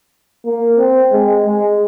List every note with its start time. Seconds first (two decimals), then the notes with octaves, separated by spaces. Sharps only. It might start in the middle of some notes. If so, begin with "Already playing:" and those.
0.45 A#3
0.79 C4
1.12 G#3
1.46 G#3